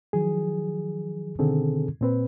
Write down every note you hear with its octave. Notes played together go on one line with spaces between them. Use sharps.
D#3 F3 F#3 G#4
B2 D3 D#3 C4 G#4 A4
A#2 C4 B4